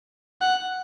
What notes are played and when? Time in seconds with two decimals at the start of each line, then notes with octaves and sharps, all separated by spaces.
0.41 F#5